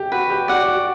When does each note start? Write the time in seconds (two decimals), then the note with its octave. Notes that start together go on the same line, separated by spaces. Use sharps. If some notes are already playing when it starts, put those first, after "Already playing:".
Already playing: G4
0.12 F#4 B4
0.30 G4
0.48 F#4 D5 F#5
0.67 F#4